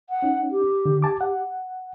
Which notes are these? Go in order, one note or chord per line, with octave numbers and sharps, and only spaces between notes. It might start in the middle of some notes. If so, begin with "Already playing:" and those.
F#5
C#4 D#4
G4
D3
G#5 A5 D6
F#5